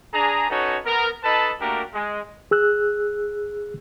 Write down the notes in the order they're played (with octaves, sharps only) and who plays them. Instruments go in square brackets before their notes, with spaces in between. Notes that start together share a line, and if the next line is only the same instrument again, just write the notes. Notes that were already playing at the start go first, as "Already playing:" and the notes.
[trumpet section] D4 G#4 A#5
C#4 D#4 F#4 A4 B4 C#5
B3 A#4
D#4 A4 B4 D#5 A5 B5
A3 A#3 D4 F#4 G4 A#4
G#3
[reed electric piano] G#4 E6 F#6